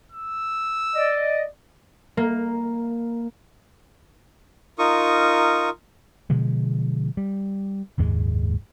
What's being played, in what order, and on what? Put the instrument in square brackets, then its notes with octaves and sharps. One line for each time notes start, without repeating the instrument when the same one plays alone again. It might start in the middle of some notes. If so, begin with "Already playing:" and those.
[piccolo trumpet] E6
[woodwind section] D5 D#5
[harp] A#3
[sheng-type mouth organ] D#4 F4 A#4 C#6 D#6
[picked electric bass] B2 D3 F3 G#3
G3
F#1 D#2 G#2 G#3